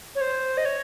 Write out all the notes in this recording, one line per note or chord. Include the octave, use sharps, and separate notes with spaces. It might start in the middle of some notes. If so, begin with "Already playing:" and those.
C#5
C5
D#5
C#5